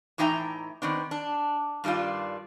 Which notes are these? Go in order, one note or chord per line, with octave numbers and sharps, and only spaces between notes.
A2 E3 D#4 E5 G5 A#5
D#3 B3 C4 D4
D4
G2 D#3 G3 D4 F4